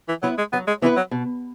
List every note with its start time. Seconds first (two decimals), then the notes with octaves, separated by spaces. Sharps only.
0.09 E3
0.23 F#3 B3 E4 B4
0.38 G#3
0.53 F#3 B3
0.68 G#3
0.82 E3 B3 E4 B4
0.97 F#3
1.11 B2